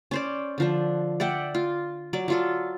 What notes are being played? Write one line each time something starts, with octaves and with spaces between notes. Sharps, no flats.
C#4 C5 D5
D3 F3 D4
D5 E5 F#5 G5
F4
F#3 D5
F#3 F4 A4